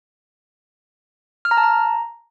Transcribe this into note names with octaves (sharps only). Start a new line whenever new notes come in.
F6
A#5
A5
A#5